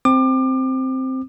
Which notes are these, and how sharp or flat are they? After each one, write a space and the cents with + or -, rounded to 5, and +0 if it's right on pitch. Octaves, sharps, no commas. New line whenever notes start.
C4 +0 D6 +30